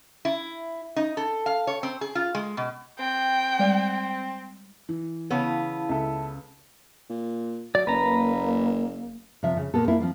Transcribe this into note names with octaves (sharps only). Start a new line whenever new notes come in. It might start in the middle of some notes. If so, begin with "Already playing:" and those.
E4
D#4
A4
F5
C#5
C4
G#4
F4
G#3
B2
C4 G5
G3 G#3 D5
E3
C#3 B3 E4 F5 A5
C#2 A4 E5
A#2
F#3 D5
F#1 A#3 B4 A#5
C3 F3 E5
C#3
A#2 A#3 B3 A4
A#3 C4 E4 F4
F3 C4 F4